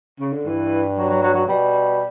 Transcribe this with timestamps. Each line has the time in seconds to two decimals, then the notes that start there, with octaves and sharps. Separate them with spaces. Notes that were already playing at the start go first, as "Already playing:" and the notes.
0.20 C#3
0.33 D3
0.46 G2 E3
0.98 F#3
1.09 F#3
1.22 F#3
1.34 F#3
1.47 B2 G3